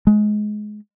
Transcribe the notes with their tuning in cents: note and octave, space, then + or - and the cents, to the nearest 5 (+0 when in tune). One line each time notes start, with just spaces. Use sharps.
G#3 +20